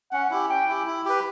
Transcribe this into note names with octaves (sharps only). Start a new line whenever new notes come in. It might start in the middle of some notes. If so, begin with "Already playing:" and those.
C#4 F#5
E4 G4
C#4 G5
E4 G4
E4
G4 B4